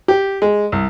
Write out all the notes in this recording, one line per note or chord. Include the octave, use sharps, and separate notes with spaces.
G4
G#3
C2